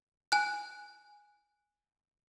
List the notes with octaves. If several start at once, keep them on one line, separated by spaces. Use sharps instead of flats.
G#5 F#6